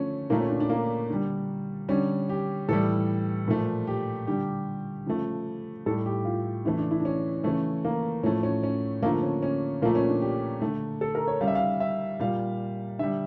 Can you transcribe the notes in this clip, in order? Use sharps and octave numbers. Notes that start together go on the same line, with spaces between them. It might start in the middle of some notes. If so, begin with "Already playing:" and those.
Already playing: D3 F3 A3 C#4
A#2 A3 A#3
C#4
D4
D4
A#3
D3 G3
D3 G3 C#4
G4
A2 E3 G3 A4
A#2 F3 A3
G4
D3 G3 G4
C#3 F3 A3
A2 G3 A4
G4
F4
C#3 E3 A3 E4
D4
E4
D4
C#4
C#3 E3 A3 C#4
A#3
A2 F3 A3 C#4
C#4
C#4
D3 F3 A3 A#3
C#4
C#4
A#2 F3 A3 A#3
C#4
D4
G4
D3 A3
A4
A#4
C#5
C#3 G3 F5
E5
F5
E5
A#2 G3 F5
D3 G3 E5